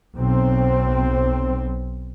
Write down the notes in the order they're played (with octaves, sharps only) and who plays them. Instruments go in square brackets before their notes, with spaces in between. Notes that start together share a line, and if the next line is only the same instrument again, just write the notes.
[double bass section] B1 C4